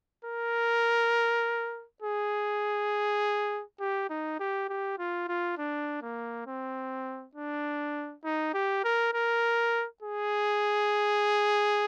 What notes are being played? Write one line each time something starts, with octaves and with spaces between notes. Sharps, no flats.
A#4
G#4
G4
D#4
G4
G4
F4
F4
D4
A#3
C4
D4
D#4
G4
A#4
A#4
G#4